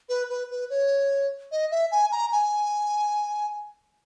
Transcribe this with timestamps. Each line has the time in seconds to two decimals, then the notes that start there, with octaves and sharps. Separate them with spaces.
0.09 B4
0.29 B4
0.50 B4
0.70 C#5
1.52 D#5
1.71 E5
1.92 G#5
2.12 A#5
2.32 G#5